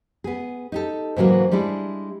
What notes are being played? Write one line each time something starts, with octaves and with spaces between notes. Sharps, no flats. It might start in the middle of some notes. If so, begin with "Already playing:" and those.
B3 G#4
D#4 G4 A4
G#2 C#3 E3 F#3 A#3 F#4
G3 G#3 D4 E4